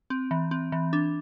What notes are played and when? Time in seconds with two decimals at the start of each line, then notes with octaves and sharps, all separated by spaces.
0.10 C4
0.31 E3
0.51 C4
0.72 E3
0.93 D4